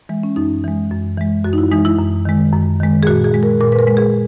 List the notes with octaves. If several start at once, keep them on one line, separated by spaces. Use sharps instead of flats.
E3 G#3
C#4
F#2 D#4
E3 G#3
F#2
E3 G#3
F#2 F#4
D#4
E4
E3 G#3 D#4
E4
F#2
D#3 G#3
F#2
D#3 G#3
G#4
A#2 F#4
G#4
G#3
A#4
A#2 A#4
B4
A#4
G#3
G#4